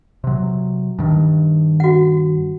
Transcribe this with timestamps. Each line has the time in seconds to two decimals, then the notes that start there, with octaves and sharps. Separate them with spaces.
0.24 C3 F#3
0.99 G2 D#3
1.80 F#4 F#5